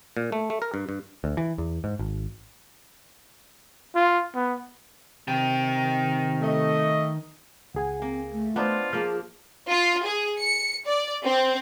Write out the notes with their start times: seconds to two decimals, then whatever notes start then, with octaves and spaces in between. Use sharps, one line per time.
0.17 A#2
0.32 A3
0.50 A3
0.62 A#4
0.74 G2
0.89 G2
1.24 D2
1.37 E3
1.58 E2
1.84 G#2
1.99 G#1
3.95 F4
4.35 B3
5.28 C3 D#3 G5
6.42 A3 D#5
7.74 C#2 G#4 F#5 G#5
8.02 A#3 C4
8.32 A3
8.56 B3 D4 D#4 F4 C5 D5 F#5
8.93 F3 A#3 D4 G#4 F6
9.69 F4
10.04 G#4
10.40 C#7
10.86 D5
11.26 C4